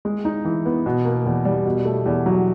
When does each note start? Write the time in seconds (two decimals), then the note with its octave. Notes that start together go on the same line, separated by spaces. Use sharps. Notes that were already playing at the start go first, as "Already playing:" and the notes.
0.05 G#3
0.25 D#4
0.45 E3
0.66 B3
0.86 B2
1.05 A#3
1.26 E2
1.45 G3
1.66 B2
1.85 A3
2.06 E2
2.26 F#3